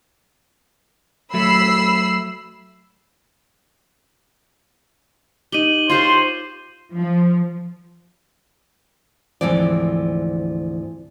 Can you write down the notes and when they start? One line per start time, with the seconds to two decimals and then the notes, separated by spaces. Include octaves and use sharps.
1.34 F#3 A3 B5 E6 C7
5.52 D#4 G4 D#7 F#7 G7
5.90 F4 G4 C5 C#5 C6
6.95 F3
9.41 D2 G#2 E3 F3 C4 D5